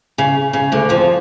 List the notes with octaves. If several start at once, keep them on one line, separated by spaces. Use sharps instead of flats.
C#3
C#3
D2 D3
F2 F3